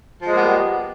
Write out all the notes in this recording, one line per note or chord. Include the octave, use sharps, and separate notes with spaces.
F3 G3 G#3 A#3 B3